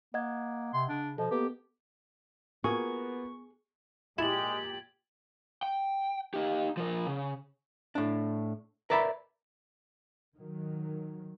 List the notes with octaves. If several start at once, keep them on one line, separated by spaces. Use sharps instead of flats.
A#3 D#5 F#5 G#6
C3 C6
C#3 D4
B2 F3 A4 D#5
A#3 B3 G4
A#3 B3 F4 F#4 G#4 C#6
A#2 G#3 E4 G4 G#6 A6 F#7
G5
D#4 G4
F3 A#4
C#3
A2 D4
A#4 B4 D5 E5 G5 B5
D#3 F#3